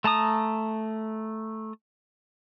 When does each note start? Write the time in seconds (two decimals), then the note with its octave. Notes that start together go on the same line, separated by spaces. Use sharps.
0.04 A3 A5 A#5 D#6